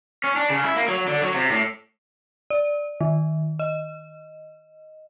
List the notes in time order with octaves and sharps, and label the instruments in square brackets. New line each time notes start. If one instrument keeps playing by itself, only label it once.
[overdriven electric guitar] C#4
D4
C#3
E4
A#3
F#3
D3
F#3
C3
A2
[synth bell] D5
D#3
D#5